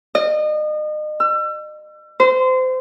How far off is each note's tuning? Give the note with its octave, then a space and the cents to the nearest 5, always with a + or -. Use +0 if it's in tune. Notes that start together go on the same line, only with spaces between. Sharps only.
D#5 -35
E6 +35
C5 -25